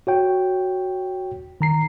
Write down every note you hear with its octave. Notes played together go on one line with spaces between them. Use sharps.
F#4 C#5 G5
D#3 A#5 C7